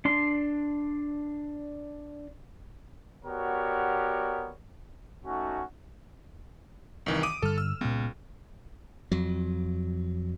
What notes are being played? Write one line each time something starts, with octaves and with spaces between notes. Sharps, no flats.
D4 C6
B3 F#4 G4 A#4 C#5 D5
A3 C#4 D#4 F#4
C2 D#3 E3
D6 D#6 D#7
G2 D3 G3 A4 F6
E6
C#2 A#2 B3
F2 F#3